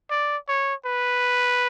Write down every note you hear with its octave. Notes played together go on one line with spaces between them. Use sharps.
D5
C#5
B4